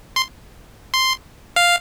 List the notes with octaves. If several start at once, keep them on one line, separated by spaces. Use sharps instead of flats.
C6
C6
F5